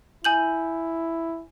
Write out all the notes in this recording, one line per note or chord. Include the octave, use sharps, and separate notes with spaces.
E4 G#5 G6 F#7